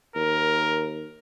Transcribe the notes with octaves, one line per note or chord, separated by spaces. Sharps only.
D#2 A#4